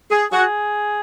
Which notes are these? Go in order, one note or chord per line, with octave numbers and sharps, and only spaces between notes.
G#4
F#4 G#4